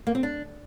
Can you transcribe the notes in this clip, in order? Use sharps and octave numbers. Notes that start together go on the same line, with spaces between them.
A#3
C4
D4